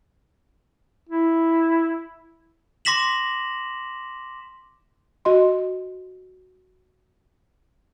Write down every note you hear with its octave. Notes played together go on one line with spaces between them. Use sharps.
E4
C6 D6 A#6 B6 E7 F#7
F#4 D#5 C6